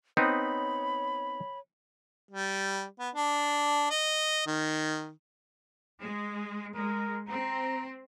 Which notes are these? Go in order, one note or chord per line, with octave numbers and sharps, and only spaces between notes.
B3 C4 D#4 C#5 B5
G3
B3
D4
D#5
D#3
G#3
G#3 A#4
C4 A#5